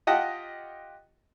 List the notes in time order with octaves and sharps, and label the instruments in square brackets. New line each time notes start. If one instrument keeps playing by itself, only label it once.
[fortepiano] F4 G4 D#5 F#5 G5 A5